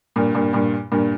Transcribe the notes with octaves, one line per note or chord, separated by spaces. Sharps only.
G2 A#2
G2 A#2
G2 A#2
G2 A#2